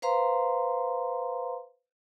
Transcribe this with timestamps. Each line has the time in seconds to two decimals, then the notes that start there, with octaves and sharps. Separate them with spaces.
0.02 B4 C5 F5 A#5 C6